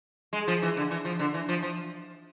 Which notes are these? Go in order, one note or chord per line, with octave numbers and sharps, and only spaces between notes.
G#3
F3
E3
D3
E3
F3
D3
E3
F3
F3